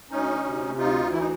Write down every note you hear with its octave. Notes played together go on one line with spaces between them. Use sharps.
D2 C#4 D#4
C3
D2 D#4 F4
E3 E4
D#4